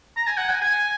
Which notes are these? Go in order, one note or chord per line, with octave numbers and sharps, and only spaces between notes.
A#5
G#5
F#5
G#5
G#5